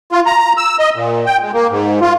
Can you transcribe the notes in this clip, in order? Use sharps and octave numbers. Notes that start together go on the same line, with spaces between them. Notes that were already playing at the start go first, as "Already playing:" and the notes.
F4
A#5
E6
D#5
A#2
G5
G#3
A#3
G#2
F4